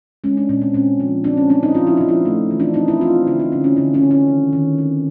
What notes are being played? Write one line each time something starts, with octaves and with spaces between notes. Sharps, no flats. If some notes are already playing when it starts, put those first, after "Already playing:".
G#3 C#4
D4
A#2 C#4
C4
A#2 C#4
F3
C4 D4
C#4
C4 D4
D#4
F3 F4
E4
F3 D#4
E4
A3
E3
D4
C4 D#4
E4
C4 F4
D3 E4
D#4
D3 C#4
C#4
D3 C#4
C#4
D3
C#4
D#3
D#3
C4